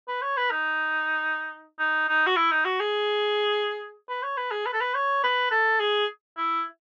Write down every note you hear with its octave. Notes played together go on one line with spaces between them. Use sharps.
B4
C#5
B4
D#4
D#4
D#4
F#4
E4
D#4
F#4
G#4
B4
C#5
B4
G#4
B4
A4
B4
C#5
B4
A4
G#4
E4